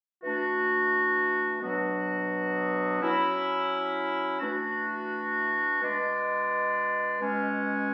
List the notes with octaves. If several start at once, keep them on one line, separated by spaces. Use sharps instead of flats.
E3 A3 D4 F#4
B2 F#3 B3 D4 F#4
F#3 C#4 E4
E3 A3 D4 F#4
B2 G#3 D4
B2 G#3 C#4